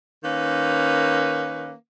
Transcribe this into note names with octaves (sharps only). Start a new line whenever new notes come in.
D#3 A#3 C#4 B4